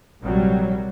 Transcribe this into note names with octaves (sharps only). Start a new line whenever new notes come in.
A#1 C3 F#3 G3